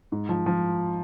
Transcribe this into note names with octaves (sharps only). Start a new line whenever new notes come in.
G#2
F3
F3